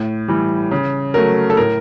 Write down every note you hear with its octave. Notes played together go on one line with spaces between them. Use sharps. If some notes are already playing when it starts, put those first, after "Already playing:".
Already playing: A2
E3 G3
C#3
F#3 A3 A#4
A4
A2 A#4